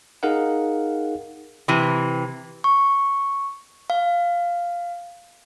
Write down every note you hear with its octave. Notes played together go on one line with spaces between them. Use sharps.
D#4 G#4 A#4 F5 F#5
C3 E3
C#6
F5